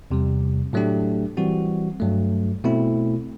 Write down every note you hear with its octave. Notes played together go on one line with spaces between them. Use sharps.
E2 C3 G3
A2 F#3 A3 D4 G4
E3 G3 C4 F#4
G2 F#3 A3
B2 A3 C4 E4